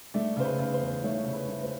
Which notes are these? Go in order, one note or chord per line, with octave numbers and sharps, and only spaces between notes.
A3 D5
C#3 C5
B4
C#3
C5
E2
A3 C#5
C#3
B4
A3
C5